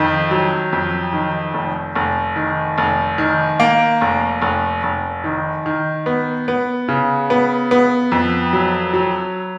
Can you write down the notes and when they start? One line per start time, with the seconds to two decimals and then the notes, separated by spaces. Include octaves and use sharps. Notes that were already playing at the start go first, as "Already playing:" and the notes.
Already playing: F2 D#3
0.31 F#3
0.72 F2
1.13 D#3
1.54 F1
1.95 F1
2.36 D#3
2.78 F1
3.18 D#3
3.60 A#3
4.01 F1
4.42 F1
4.83 F1
5.24 D#3
5.66 D#3
6.06 B3
6.48 B3
6.88 C#3
7.30 B3
7.71 B3
8.12 F2
8.53 F#3
8.93 F#3